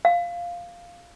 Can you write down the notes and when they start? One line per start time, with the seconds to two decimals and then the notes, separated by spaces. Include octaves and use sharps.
0.05 F5